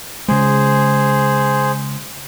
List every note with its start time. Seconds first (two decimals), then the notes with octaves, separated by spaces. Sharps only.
0.28 C#3 G#3 G#4 C5